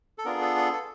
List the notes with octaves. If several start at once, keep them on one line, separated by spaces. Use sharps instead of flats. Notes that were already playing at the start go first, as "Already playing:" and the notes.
A4
B3 D4 F4 G#4 A#4
A4
A4
A4